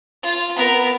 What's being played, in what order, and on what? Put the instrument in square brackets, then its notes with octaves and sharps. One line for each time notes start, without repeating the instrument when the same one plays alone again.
[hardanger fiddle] F4
B3 A#4